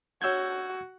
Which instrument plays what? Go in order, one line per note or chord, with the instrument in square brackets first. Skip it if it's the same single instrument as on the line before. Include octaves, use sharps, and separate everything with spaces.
[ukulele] D4 C#5 [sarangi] F#4 [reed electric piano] E6 G6 G#6